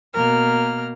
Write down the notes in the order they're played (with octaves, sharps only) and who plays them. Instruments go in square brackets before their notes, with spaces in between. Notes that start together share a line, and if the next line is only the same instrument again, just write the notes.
[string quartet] B2 A#3 A#4 F6